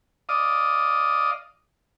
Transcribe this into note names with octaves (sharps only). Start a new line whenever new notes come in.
D5 D#5 F5 D#6